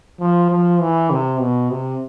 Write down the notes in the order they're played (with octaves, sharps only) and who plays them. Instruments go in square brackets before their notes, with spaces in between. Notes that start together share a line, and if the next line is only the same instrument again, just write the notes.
[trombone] F3
F3
E3
C3
B2
C3